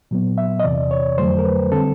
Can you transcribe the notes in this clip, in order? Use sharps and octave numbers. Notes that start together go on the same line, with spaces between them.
A#2 F#3 B3
E5
D#5
E2 C3 E3 D5
C#5
F2 D3 F#3 A3 C5
A#4
B4
D3 G3 C4 A4